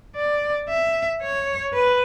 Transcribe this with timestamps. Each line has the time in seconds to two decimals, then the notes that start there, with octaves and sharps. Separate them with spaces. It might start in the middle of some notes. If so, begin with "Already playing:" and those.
0.16 D5
0.69 E5
1.22 C#5
1.73 B4